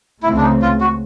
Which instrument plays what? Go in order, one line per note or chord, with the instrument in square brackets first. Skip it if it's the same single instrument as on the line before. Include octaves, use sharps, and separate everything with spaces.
[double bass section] C#2 C#3 E3 A3 C4 [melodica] E4
[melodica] D4
D#4
F4
F#4